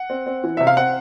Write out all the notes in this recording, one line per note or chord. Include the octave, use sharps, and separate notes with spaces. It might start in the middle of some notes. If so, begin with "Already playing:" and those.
Already playing: F#5
C4
C4
E3
C3 E5
F5
C4 F#5